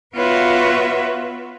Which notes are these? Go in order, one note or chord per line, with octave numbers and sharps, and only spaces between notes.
B3 F4 F#4 B4 C#5 E5